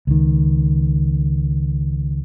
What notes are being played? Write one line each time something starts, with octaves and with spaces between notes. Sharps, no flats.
C#2 D#3